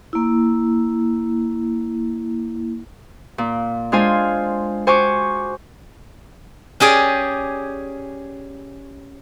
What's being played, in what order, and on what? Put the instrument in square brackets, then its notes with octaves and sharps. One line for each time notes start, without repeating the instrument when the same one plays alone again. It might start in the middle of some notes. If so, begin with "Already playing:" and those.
[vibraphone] A#3 E4
[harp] A#2
G#3 D4 F4 C5 G#5
F#4 C5 G#5 C#6 D6
[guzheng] C#4 G4 G#4 D5